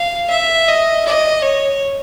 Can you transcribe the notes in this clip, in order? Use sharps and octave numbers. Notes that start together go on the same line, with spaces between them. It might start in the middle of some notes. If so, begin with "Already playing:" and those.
Already playing: F5
E5
D#5
D#5
C#5